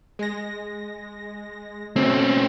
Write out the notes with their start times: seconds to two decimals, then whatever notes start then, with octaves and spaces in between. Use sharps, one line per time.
0.19 G#3 A#6
1.96 B2 A3 C4 C#4